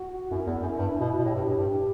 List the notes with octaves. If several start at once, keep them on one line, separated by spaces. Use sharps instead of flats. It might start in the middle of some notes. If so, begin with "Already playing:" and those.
Already playing: F#4
F#2 E4
E2
F#2
G2
B2
B2
A2 G4
G2
A2
G2